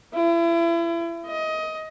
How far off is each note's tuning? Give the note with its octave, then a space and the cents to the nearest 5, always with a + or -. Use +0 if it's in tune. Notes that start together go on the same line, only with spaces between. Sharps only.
E4 +35
D#5 +20